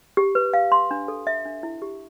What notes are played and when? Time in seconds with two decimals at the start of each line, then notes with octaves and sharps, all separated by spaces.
0.17 G4
0.35 B4
0.54 F5
0.72 C6
0.91 D4
1.08 A4
1.27 E5
1.45 D4
1.63 E4
1.82 G4